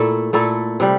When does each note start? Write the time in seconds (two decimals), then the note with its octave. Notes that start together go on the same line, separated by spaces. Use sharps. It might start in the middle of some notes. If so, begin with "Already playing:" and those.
Already playing: A#2 A3 E4 A4
0.33 A#2 A3 E4 A4
0.80 C3 G3